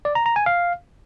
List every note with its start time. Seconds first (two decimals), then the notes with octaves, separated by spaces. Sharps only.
0.05 D5
0.15 A#5
0.26 A#5
0.36 G#5
0.46 F5